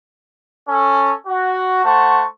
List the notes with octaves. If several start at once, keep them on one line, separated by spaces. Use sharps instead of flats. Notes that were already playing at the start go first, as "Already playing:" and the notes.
C#4 A4
F#4
A3 C5 F#5 A5 C#6